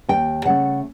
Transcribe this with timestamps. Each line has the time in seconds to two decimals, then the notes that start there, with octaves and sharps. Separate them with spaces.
0.08 D#2 G5
0.45 C#3 F#3 A3 F#5